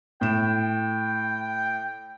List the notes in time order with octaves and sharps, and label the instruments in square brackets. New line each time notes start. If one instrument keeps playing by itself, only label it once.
[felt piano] A2 E7 [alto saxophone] G5